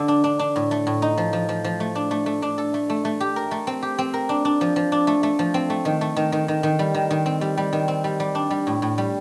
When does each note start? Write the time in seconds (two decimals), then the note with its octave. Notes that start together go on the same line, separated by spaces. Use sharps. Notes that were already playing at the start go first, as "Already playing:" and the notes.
Already playing: D3 A4
0.08 D4
0.24 D4
0.39 D4
0.56 A2
0.71 A3
0.87 A2
1.02 D#4
1.18 F3
1.33 F3
1.49 F3
1.64 F3
1.80 A3
1.95 D4
2.11 A3
2.26 A3
2.42 D4
2.58 A4
2.74 A3
2.90 A3
3.05 A3
3.20 G4
3.36 A#4
3.51 A3
3.67 C4
3.82 G4
3.99 C4
4.14 A#4
4.29 D4
4.45 D4
4.61 F3
4.76 F3
4.92 D4
5.07 A3
5.23 A3
5.39 F3
5.54 C4
5.70 A3
5.85 D#3
6.01 A3
6.16 D#3
6.32 D#3
6.48 D#3
6.63 D#3
6.79 G3
6.94 D#3
7.11 D#3
7.26 C4
7.41 G3
7.57 G3
7.73 D#3
7.88 C4
8.04 G3
8.20 G3
8.35 D4
8.51 G3
8.67 A2
8.82 A2
8.98 G3